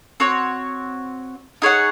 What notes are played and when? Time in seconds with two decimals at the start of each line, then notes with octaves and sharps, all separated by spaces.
0.20 C4 F#4 C#5
1.62 D#4 G#4 C#5 F#5